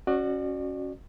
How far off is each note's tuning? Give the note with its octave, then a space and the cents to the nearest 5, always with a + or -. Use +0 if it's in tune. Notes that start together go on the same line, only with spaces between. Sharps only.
C#4 -10 F#4 +0 D5 +35